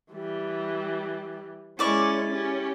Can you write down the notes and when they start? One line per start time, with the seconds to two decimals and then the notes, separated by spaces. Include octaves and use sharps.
0.12 E3 G3
1.79 G#3 C#4 E4 D5 C#6
2.31 C#4 G4